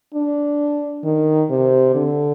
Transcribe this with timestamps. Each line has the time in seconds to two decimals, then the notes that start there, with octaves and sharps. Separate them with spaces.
0.14 D4
1.04 D#3
1.50 C3
1.95 D3